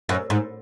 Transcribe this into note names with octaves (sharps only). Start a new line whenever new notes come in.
F#2
G#2